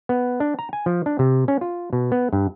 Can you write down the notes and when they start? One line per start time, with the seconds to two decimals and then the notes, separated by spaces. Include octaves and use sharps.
0.09 B3
0.40 D4
0.59 A#5
0.73 G#5
0.86 F3
1.06 D4
1.19 C3
1.48 C#4
1.61 F4
1.93 B2
2.12 B3
2.33 G2